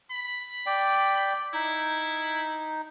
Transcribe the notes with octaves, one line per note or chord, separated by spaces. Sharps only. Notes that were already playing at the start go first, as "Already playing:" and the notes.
B5
D5 G5
D#4 E4